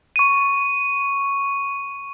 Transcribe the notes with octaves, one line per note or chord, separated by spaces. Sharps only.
C#6 D#7